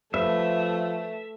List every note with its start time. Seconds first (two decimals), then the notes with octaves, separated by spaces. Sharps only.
0.14 F3 A3 B4 E5